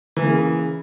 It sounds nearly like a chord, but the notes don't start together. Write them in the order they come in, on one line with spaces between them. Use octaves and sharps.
E3 A#3 C#3